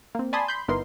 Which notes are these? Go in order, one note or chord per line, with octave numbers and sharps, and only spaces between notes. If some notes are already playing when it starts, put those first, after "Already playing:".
A#3 C4
D5 G#5 A5 B5 C6 D#6
B5 C6 G6
G1 B3 D#4 E4 A#4 C6